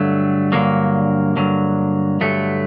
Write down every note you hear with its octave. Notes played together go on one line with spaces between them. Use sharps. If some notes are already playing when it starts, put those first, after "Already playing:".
Already playing: G2 D3 F#3 A3
G2 D3 F#3 A#3
G2 D3 F#3
G2 D3 F#3 A3